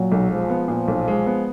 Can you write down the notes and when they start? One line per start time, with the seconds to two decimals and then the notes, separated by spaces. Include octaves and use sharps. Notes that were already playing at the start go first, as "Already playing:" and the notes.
Already playing: A#2 F#3
0.12 B1
0.31 F3 G#3
0.50 B3
0.68 A#2
0.88 B1
1.08 G#3
1.26 B3